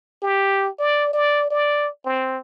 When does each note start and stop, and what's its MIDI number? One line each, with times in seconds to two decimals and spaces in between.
0.22 0.69 67
0.79 1.10 74
1.13 1.48 74
1.51 1.89 74
2.06 2.38 60